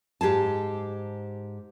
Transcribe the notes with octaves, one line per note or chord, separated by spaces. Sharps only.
G#2 G4 G#4 A5